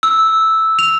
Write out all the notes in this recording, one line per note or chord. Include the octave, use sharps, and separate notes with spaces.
E6
F7